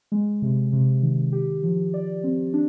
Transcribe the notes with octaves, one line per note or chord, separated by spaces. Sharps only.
G#3
C3
C3
D#3
G4
F3
D5
C4
D4